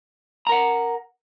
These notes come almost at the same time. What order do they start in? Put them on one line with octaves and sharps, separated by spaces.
A#5 A#4 F#5